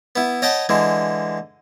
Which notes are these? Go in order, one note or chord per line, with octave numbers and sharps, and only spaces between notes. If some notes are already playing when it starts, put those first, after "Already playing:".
B3 E4
C#5 D#5 F#5 G5 A5 B5
D3 E3 G#3